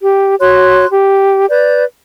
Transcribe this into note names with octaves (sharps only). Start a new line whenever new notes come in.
G4
F#4 C#5 C6 F#6
G4
B4 D5 G6